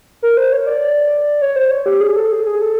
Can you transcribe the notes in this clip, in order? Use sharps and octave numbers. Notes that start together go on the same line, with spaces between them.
A#4
C5
C#5
D5
C#5
C5
C#5
G4
G#4
A4
G#4
G#4
A4